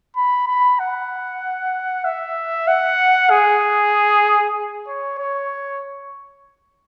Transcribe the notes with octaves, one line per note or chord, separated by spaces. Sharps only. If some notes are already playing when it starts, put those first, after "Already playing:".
B5
B5
F#5
E5
F#5
G#4
C#5
C#5